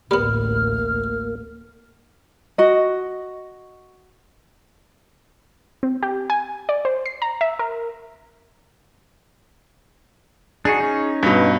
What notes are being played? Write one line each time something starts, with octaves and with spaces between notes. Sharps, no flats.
A1 D2 G3 A#3 B3 F6
F#4 D#5
C4
G4
G#5
D5
C5
C7
A#5
E5
A#4
D4 D#4 F#4 G#4
C#4 D#4
G2 B2